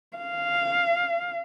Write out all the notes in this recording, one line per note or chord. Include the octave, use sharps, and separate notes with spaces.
F5